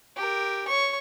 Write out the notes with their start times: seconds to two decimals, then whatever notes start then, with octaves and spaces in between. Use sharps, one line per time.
0.16 G4 A#4
0.68 C#5 C#6